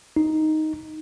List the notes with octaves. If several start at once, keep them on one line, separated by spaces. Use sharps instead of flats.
D#4